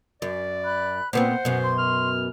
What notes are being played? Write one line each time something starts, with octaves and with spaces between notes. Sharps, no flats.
F#2 D5
B5 F#6
A#2 B3 C4 C5 F#5
F#2 B2
C6
F6